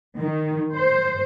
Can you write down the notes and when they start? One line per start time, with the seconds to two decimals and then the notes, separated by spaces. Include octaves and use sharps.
0.19 D#3
0.75 C5